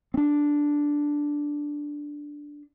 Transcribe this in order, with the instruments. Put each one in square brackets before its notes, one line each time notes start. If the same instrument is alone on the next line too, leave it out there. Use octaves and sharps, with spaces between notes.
[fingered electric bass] C4 D4